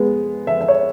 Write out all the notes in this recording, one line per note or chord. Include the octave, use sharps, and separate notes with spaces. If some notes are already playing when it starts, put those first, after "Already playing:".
Already playing: G#3 B3
E5
E5
C#5